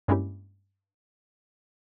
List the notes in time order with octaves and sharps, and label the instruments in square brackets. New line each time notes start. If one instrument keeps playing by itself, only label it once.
[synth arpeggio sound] G2 G#3 A#3 C#4 E4 G4